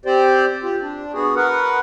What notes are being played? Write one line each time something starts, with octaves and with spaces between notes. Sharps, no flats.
C4 G4 C5 D5
F4 G4
D4
B3 F#4 G#4
A#4 B4 F#5